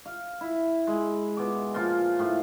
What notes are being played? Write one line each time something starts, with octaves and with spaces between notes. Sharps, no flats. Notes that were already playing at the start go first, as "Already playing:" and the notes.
F5
E4
G#3
B2 D6
A#2 F3 F4
A2 F4